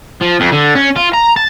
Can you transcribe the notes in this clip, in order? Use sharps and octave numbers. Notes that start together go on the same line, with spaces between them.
F3
F2
D3
C#4
F4
A#5
A5